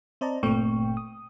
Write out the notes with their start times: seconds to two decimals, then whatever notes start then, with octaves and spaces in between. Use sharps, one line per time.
0.21 C4 C5 D5 D#5 A5 A#5
0.43 G1 A#2 A3 C4 G5 C#6
0.97 D#6